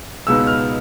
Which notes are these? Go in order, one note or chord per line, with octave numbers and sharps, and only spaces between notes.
C#2 B2 G#3 B3 D#4 E6
F6